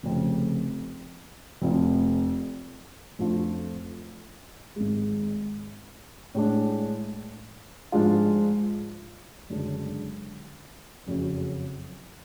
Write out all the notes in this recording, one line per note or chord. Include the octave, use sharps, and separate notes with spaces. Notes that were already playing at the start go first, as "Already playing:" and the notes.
F1 F2 C#3
F1 F2 F3
F2 F3 A3 D4 F4
G#1 G#2 G#3
A2 G#3 D4
G#2 F3 G#3 D4 F4
F#1 F#2 D3 G#3 D4
F#1 F2 C#3 F#3